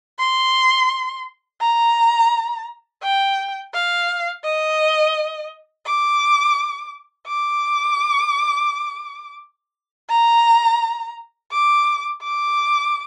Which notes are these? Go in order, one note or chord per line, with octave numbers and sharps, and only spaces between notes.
C6
A#5
G5
F5
D#5
D6
D6
A#5
D6
D6